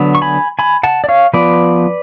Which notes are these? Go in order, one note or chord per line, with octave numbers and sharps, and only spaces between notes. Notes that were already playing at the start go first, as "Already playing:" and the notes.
Already playing: D3 F#3 B3
C#6
G#5 B5
G#5 B5
F#5 A5
D5
C#5 F5
F3 B3 B4 D5